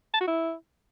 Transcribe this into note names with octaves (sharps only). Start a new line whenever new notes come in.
A5
F#4
E4